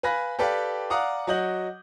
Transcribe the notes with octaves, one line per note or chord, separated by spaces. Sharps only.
B4 F5 G#5 B5 F#6 A#6
G4 A4 B4 D5 F5 G5
D5 F5 F#5 A#5 D6 D#6
F#3 F#4 D#5 G6 F#7